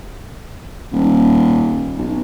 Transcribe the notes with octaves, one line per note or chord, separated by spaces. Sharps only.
D#1
B1